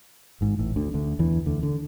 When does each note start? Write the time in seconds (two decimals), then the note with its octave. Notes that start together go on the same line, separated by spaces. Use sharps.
0.41 G#1 G#2
0.59 A1 A2
0.76 D2 D3
0.94 D2 D3
1.19 E2 E3
1.46 D2 D3
1.63 D3